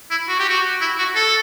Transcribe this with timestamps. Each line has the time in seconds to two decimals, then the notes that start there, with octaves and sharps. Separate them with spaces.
0.11 E4
0.28 F#4
0.39 G4
0.50 F#4
0.81 E4
0.99 F#4
1.15 A4